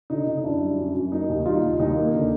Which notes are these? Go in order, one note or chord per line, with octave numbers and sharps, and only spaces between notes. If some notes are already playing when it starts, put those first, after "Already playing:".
D3 D#4
D3 D#4
F#2 D4 E4
G3
F#2
F#2
A#3 D#4
D#2
G3 D#4 F4
D#2
D#2 D#4
A#3
D3